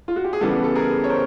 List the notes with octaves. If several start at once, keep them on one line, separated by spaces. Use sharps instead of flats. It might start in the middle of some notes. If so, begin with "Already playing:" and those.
F4
F#4
G4
G#4
C#3 E3 G3 B3 G4 A4
A4
G#4 A#4
C#5
A#4 C5